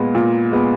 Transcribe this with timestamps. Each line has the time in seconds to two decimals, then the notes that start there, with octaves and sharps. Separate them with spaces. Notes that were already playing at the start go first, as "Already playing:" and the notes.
Already playing: A#2 G#3 B3
0.15 A#2
0.52 G#3 B3